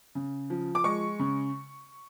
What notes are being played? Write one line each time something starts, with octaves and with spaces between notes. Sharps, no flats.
C#3
F3
D6
G#3 C#6
C#3